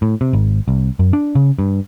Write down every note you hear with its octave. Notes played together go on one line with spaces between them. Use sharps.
A2
C3
G#1
C2
F#2
D4
C#3
G2